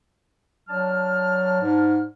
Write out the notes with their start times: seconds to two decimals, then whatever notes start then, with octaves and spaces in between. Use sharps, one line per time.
0.69 F#3 D4 A5 F6
1.61 G#2